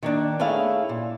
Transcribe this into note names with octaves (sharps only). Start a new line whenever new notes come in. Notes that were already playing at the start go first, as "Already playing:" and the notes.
D#3 A#3 D4
A3 C#4 E4 G#4 F5
A#2